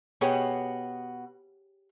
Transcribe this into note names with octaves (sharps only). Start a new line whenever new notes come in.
B2 B3 G4 G#4 C#5